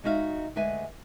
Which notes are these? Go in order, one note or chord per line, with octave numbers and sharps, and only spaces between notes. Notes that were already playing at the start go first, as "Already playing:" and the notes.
G#3 D#4 F#4 E5 F5
D2 G#3 B4 E5 G#5